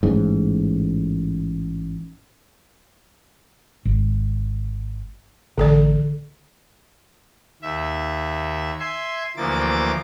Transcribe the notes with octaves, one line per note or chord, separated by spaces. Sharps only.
A1 G#2
G#1
A1 D3 A4 D5
D#2 E5
E5 G#5 C6
D2 E3 F3 A#3 D6 A6